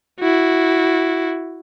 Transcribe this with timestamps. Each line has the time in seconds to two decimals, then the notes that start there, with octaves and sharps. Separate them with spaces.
0.20 E4 F#4